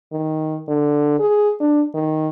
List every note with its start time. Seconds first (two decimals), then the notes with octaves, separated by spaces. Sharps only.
0.12 D#3
0.68 D3
1.19 G#4
1.61 D4
1.95 D#3